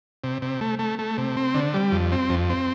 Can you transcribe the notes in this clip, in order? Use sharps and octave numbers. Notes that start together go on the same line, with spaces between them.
C3
C3
A3
A3
A3
C3
C4
D3
G3
F2
C4
F2
C4